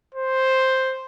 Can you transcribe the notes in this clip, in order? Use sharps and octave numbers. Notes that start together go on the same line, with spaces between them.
C5